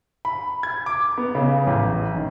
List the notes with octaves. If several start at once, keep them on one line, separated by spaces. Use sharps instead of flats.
B5
G#6
D6
B3
C#3
A1
D#3